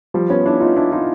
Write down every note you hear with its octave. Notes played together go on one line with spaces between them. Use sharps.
F3 G3
B3 C#4
D4 E4
D#4 F4
D4 E4
D#4 F4